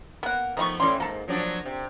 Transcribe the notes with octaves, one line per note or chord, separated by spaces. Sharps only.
A#3 B3 F#5
D#3 F3 A3 B3 E4 C#6
A2 E3 C#4 D5 C6
G#2 B2 A#3 A4
F3 F#3 D4
C3